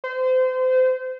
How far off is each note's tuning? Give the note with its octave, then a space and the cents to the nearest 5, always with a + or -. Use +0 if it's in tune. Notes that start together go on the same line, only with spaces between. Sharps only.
C5 -30